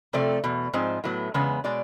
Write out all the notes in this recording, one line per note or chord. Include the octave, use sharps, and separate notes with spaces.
C3 F3 A3 C4 D5
E2 B2
G#2 F3 G#3 C4
A2 F#3 B3
E2 C#3 G#3 B3
B2 G#3 D5